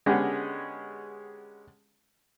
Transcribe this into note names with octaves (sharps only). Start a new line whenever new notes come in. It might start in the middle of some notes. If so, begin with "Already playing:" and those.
D3 G#3 B3 C#4 G4 G#4